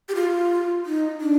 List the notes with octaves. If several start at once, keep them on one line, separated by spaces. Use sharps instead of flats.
G4
F4
D#4
D4